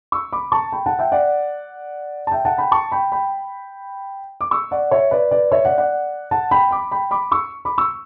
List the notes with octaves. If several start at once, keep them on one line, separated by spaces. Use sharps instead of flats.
C#6 E6
B5 D6
A5 C#6
G5 B5
F#5 A5
E5 G5
D5 F#5
A5
E5 G5
F#5 A5
G5 B5
A5 C#6
G5 B5
G5 B5
D6
C#6 E6
D5 F#5
C#5 E5
B4 D5
B4 D5
C#5 E5
D5 F#5
D5 F#5
F#5 A5
G5 B5
B5 D6
G5 B5
B5 D6
C#6 E6
B5 D6
C#6 E6